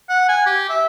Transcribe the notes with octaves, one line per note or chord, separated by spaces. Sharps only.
F#5
G#5
G4
E5